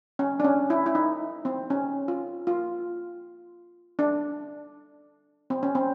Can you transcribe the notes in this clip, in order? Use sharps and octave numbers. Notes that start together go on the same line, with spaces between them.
C#4
D4
C#4
E4
E4
D#4
C4
C#4
F4
F4
D4
C4
C#4
C4